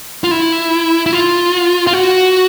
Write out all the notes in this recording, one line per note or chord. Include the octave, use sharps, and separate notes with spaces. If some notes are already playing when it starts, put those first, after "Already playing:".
F4
E4
E4
F4
F4
F#4